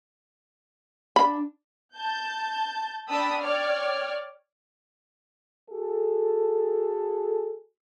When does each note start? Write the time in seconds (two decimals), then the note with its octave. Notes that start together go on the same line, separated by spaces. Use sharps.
1.16 D4 B5
1.97 A5 G6
3.09 D4 G5 A5 B5 D#6 E6
3.40 C#5 D5 G5 F6
5.70 F#4 G#4 A4